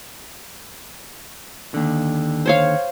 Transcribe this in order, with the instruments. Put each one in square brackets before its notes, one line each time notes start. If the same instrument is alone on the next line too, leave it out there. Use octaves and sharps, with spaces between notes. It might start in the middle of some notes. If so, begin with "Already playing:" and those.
[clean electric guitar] D#2 D3
[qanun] C5 C#5 F5